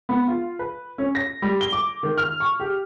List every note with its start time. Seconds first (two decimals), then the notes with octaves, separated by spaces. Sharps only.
0.09 B3
0.27 F4
0.59 B4
0.98 C#4
1.15 A#6
1.42 G3
1.61 G7
1.73 D6
2.03 D#3
2.18 F6
2.40 C#6
2.60 G4